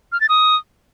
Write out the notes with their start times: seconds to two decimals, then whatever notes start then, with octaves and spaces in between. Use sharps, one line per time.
0.12 F6
0.21 A6
0.29 D#6